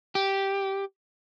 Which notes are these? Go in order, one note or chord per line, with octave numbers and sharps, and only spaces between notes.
G4